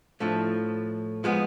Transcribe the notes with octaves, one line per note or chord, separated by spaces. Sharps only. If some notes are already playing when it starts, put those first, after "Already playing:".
A2 F3 A3 D4
F3 G#3 B3